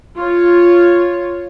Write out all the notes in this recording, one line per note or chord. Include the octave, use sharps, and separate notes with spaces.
F4 C#5